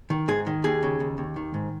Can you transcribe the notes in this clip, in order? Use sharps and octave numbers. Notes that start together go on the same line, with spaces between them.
D#3
G#2 G#4
D#3
D#2 G#4
C#3
D#2
D#2
D#3
G#2